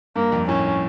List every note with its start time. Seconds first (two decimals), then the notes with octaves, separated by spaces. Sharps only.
0.16 G2 A#3
0.32 F2
0.48 A2 C#4